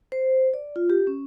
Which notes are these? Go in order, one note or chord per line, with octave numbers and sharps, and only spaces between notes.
C5
D5
F4
G4
C#4